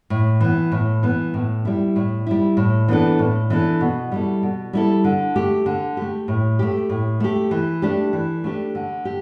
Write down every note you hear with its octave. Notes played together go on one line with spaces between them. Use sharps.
A2
E3 B3
A2
E3 B3
A2
G3 E4
A2
G3 E4
A2
E3 B3 D4 A4
A2
E3 B3 D4 A4
B2
G3 E4 A4
B2
G3 E4 A4
D3
A3 G4
D3
A3 G4
A2
A3 G4
A2
A3 G4
E3
A3 D4 G4
E3
A3 D4 G4
D3
G4